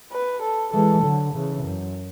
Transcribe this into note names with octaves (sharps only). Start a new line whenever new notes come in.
B4
A4
E3 G#3 A4
D3 F#3
C#3 E3
F#2